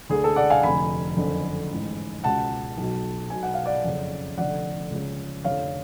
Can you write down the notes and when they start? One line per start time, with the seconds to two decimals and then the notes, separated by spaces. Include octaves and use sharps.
0.09 D2 D3 G#4
0.24 A4
0.36 D5 F#5
0.50 F5 G#5
0.63 F1 F2 D3 G#5 B5
1.17 F#1 F2 D3
1.70 A1 G#2
2.23 C#2 B2 F#5 A5
2.77 B1 B2
3.30 B1 B2 G#5
3.43 F#5
3.54 F5
3.65 D5 F#5
3.84 F#1 F2 C#3
4.37 F1 F2 D3 D5 F#5
4.91 C#2 C#3
5.44 F1 F2 D3 C#5 F5